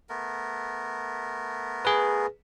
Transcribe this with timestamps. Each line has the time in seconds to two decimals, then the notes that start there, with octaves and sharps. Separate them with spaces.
0.09 A3 B3 A#4
1.85 G#4 B4